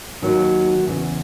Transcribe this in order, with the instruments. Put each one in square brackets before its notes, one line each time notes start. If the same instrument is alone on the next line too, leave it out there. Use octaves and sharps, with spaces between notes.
[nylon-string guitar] D#2 D#3 F#3
E2 C#3 E3